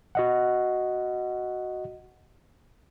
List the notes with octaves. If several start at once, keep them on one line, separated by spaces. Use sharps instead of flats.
F#4 D#5 F#5